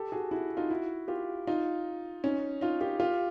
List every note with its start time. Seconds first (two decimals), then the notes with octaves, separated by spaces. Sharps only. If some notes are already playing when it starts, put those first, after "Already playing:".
Already playing: G4 A4
0.12 F#4 G#4
0.31 E4 F#4
0.57 D#4 F4
0.70 E4 F#4
1.08 F4 G4
1.47 D#4 F4
2.24 C#4 D#4
2.61 D#4 F4
2.80 F4 G4
3.00 F4 G4